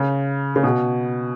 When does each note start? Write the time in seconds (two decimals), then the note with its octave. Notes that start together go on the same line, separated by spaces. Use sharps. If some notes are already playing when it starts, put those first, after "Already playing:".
Already playing: C#3
0.56 C#3
0.63 B2